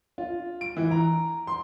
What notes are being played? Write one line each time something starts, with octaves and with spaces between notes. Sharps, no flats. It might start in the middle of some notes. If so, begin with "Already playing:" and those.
F4
D7
E3
A#5
C6